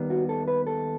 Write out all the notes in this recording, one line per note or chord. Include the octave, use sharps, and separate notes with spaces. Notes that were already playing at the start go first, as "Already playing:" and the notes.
Already playing: D#2 D#3 G3 B3
F#4
A4
B4
A4